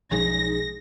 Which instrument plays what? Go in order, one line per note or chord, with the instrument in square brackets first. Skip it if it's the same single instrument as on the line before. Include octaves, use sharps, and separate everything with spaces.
[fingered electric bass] B1 F3 G#3 [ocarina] D#4 [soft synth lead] G#4 [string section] A#6